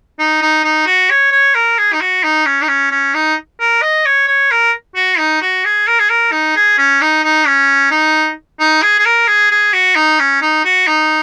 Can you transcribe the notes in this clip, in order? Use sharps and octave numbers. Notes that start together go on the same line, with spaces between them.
D#4
D#4
D#4
F#4
C#5
C#5
A#4
G#4
D#4
F#4
D#4
C#4
D#4
C#4
C#4
D#4
A#4
D#5
C#5
C#5
A#4
F#4
D#4
F#4
G#4
A#4
G#4
A#4
D#4
G#4
C#4
D#4
D#4
C#4
D#4
D#4
G#4
G#4
A#4
G#4
G#4
F#4
D#4
C#4
D#4
F#4
D#4